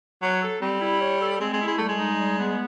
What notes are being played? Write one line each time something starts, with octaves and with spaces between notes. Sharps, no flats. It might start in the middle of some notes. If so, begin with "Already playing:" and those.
F#3 C#5
A4
G3 C4
E4
C#5
A4
G#3 C4
G#3
E4
G#3
G3 A3
G#3
D#4
G3
B3